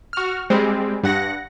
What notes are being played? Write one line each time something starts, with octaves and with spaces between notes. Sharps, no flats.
F#4 F6
G3 G#3 C4
G2 F#5 A#6